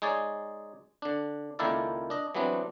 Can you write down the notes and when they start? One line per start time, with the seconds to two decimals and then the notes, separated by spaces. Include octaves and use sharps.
0.02 G#3 D#4 G#4 C#5 D5
1.02 D3 D4
1.59 C#2 D#3 A#3 E4 A4 D5
2.10 D4 D#5
2.35 E3 F#3 G3 B3 C4 D4